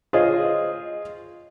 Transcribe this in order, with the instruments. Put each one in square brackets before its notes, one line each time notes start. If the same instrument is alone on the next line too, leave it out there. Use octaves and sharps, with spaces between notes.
[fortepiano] F4 G#4 C5 C#5 D#5